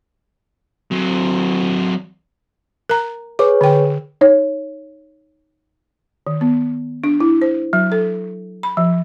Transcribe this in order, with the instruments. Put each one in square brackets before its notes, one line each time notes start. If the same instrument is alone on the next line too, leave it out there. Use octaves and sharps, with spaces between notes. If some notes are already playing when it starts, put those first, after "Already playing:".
[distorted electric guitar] F#3 C4
[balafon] A#4 A#5
[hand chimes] G#4 B4 C#5 [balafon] D6
[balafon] D3 G5
D#4 C#5
D#3
B3
D4
E4
C5
F#3
A4
B5
F3